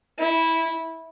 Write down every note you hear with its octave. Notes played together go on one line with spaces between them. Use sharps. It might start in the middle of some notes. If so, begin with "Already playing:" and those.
E4